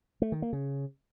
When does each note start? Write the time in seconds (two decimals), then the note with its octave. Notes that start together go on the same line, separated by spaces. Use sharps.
0.22 A3
0.32 D#3
0.42 A#3
0.53 C#3